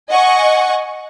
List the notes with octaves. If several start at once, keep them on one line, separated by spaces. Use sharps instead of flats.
D#5 F#5 G#5 C#6